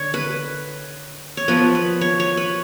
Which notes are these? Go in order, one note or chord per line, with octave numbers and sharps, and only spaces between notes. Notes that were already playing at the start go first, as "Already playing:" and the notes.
Already playing: D3 C#5
B4
C#5
F3 B3 B4
B4
C#5
C#5
B4